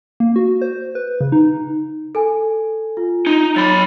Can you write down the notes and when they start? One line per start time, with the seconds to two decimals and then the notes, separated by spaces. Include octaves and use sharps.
0.20 A#3
0.36 F#4
0.62 C5
0.95 B4
1.21 C#3
1.32 D#4
2.15 A4 G#5
2.97 F4
3.27 D#4
3.56 F#3 B5 A6